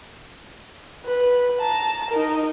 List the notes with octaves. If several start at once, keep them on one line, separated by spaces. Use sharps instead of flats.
B4
A5 A#5
D#4 A#4